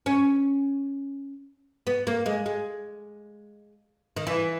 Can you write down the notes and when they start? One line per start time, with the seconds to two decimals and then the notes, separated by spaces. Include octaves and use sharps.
0.06 C#4
1.87 B3
2.07 A#3
2.26 G#3
2.46 G#3
4.16 D#3
4.27 E3